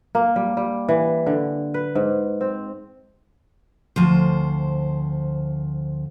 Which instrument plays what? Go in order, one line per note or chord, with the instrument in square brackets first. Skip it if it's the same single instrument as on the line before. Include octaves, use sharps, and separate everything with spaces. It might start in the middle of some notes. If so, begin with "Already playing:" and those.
[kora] A#3
G3
G3
E3
D3
B4
G#2
C4
[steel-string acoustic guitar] D2 F3 C5